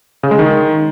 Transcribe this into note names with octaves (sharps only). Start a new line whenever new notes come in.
C#3
G#3
D#3